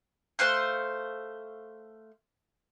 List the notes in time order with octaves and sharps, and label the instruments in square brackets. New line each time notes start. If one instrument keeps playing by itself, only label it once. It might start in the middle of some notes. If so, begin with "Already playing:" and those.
[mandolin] A3 C5 F5 F#6